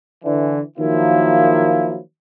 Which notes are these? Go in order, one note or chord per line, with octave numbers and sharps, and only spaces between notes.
D3 E3
D#3 F3 F#3 A#3 E4